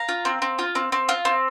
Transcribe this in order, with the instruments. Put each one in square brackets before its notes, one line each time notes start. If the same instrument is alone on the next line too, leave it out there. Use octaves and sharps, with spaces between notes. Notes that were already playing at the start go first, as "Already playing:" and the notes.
Already playing: [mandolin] F5 A#5
F4
C4
C4
F4
C4
C4
F4
C4